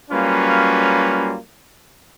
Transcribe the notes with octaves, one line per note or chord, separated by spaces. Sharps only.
F#3 G3 A#3 C#4 F4 B4